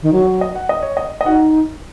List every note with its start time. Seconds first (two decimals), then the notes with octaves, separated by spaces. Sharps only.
0.02 D#3
0.13 F#3 C#5
0.27 C#5
0.41 D#5
0.55 F#5
0.69 D#5
0.82 C#5
0.97 D#5
1.21 D#5
1.26 D#4 F#4 F#5